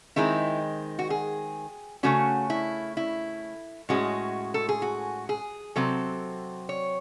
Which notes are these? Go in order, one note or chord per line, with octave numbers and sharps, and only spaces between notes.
D#3 G#3 C4 E4
F#4
G#4
C#3 E3 A3 C#4 F#4
E4
E4
A2 G#3 C#4 F#4
A4
G#4
F#4
G#4
C3 F#3 C4 A4
C#5